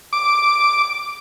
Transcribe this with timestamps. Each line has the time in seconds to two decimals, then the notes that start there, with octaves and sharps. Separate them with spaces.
0.13 D6